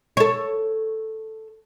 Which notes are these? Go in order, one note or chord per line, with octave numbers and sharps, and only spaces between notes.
A4 C#5